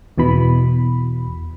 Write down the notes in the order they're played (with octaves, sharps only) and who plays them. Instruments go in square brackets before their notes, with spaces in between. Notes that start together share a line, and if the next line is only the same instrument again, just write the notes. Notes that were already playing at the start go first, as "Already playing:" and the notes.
[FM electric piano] E2 B2 E3 B5